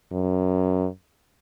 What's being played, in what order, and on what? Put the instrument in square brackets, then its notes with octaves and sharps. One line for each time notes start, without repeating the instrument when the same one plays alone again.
[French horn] F#2